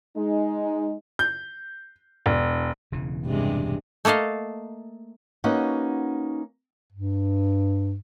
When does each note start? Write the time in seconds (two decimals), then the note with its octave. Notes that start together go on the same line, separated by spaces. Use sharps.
0.17 G#3 D#4
1.19 G6
2.26 E1
2.92 E1 C#3 E3
3.25 G2 C3 G#3
4.05 A3 A#3 A4 D#5 F5
5.44 A#3 C#4 D#4 F#4 B4 F#5
6.93 G2